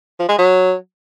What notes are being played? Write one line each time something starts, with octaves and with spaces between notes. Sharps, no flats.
F3
G#3
F#3